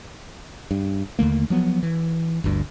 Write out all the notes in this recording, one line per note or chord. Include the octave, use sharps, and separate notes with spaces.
G2
D#2 D3 A3 A#3
F3 F#3 B3
E3
G1 D2 G2